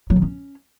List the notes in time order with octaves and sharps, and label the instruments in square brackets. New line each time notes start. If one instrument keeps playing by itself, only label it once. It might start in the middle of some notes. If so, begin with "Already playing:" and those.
[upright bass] F#3
D#3
C#4